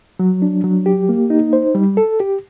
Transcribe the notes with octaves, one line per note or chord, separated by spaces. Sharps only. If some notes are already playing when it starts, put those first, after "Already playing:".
F#3
D4
F#3
G4
A#3
D#4
C5
G3
A4
G4